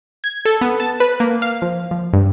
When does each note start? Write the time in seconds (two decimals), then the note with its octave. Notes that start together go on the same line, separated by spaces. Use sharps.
0.24 G#6
0.45 A4
0.61 B3
0.80 A5
1.00 B4
1.20 A#3
1.42 F5
1.62 F3
1.91 F3
2.13 G2